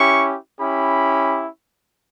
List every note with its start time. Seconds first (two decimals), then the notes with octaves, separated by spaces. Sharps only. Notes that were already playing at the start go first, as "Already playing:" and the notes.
Already playing: C#4 E4 G4 C#6
0.60 C#4 E4 G4 B5